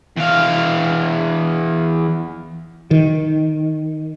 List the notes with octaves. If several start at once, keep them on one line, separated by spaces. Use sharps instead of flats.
E2 F5
D#3